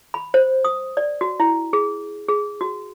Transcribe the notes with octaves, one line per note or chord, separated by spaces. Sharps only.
B5
C5
D#6
D5
F#4
E4
G#4
G#4
F#4